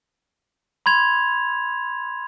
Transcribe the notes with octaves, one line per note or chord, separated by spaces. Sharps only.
B5 C6 G#6 F7